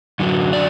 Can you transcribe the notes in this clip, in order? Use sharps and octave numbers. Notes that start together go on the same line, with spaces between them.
F#2 D3 F#3
D5